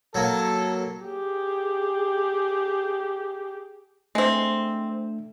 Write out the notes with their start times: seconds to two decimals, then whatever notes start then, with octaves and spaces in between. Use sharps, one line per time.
0.15 F#3 A#3 A4
1.05 G4 G#4
4.15 G#3 A3 C4 D4